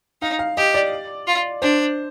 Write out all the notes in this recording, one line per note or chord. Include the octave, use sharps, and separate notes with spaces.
D#4 F5
F5
G4 D#5
D5
F4
D4 C5